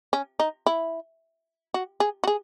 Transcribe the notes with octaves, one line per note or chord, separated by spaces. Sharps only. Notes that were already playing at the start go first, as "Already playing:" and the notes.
C#4
D#4
E4
F#4
G#4
F#4
G#4